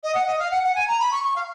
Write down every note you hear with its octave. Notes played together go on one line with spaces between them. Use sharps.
D#5
F#5
D#5
F5
F#5
F#5
G#5
A#5
B5
C#6
C#6
F5